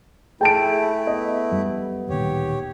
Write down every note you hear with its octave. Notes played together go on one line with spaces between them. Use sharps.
A3 E4 G#4 G5 A5 D7
B3 D#5
F#2 G3
D1 A#2 D#3 G4 C#5